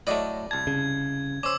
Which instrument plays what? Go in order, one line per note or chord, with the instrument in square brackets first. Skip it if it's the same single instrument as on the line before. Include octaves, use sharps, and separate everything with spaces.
[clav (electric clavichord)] A2 F#3 A3 [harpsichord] D5 D#5 B5
[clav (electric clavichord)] C2 A5 [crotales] G#6
[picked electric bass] C#3
[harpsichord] C#4 C5 [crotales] D6 E6